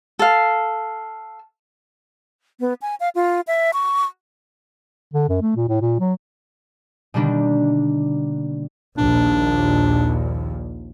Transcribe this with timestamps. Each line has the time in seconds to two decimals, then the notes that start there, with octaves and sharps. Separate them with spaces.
0.19 A4 F5
2.60 B3
2.82 G#5
3.00 F5
3.15 F4
3.47 E5
3.73 C#6
5.14 D3
5.29 F#2
5.42 A3
5.56 A#2
5.69 A2
5.81 A#2
6.00 F#3
7.14 B2 D3 D#3 G3 A#3 D4
8.98 A#1 D#2 A#2 D4